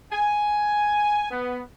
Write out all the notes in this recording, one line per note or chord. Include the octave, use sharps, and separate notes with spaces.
G#5
B3